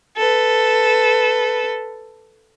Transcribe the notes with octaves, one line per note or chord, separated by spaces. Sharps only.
A4 B4